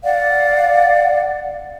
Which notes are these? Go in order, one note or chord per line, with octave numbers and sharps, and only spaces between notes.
D5 F5 F#5